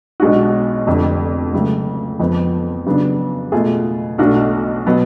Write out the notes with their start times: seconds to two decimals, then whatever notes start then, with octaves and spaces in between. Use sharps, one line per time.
0.20 B1 B2 G#3 D4 F#4
0.87 F1 F2 D3
1.53 C#2 C#3 F#3 A3
2.19 F2 F3 B3
2.86 C#3 F#3 B3 D4
3.52 B2 A3 F4 G#4
4.18 B1 B2 A3 D4 F#4
4.86 B2 F#3 B3